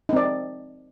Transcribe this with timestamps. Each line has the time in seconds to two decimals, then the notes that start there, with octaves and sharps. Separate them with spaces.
0.09 D#4
0.13 C4
0.16 D5